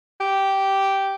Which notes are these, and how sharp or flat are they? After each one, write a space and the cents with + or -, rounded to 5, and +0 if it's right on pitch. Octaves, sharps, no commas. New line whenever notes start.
G4 -10